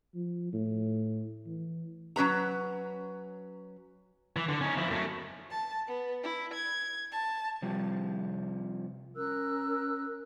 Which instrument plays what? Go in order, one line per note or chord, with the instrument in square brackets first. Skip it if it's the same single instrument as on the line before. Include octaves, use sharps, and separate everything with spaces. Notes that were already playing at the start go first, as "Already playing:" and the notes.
[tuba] F3
A2
E3
[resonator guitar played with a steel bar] F#3 C#4 B4 A#5
[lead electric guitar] E3
D3
C#4 D#4
F3 E4
F#2 A3
[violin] A5
B3
E4
G#6
A5
[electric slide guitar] C3 F3 G3
[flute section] C#4 A#4 E6 F#6